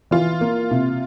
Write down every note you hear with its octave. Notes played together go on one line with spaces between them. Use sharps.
E3 F4
A#3
C3